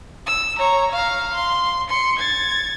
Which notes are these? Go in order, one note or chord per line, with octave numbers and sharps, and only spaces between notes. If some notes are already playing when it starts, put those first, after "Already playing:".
E6
C#5 A#5
F5 A#5
C6
C6 C#7
G#6 A6